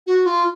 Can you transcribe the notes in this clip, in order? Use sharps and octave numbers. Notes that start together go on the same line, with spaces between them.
F#4
F4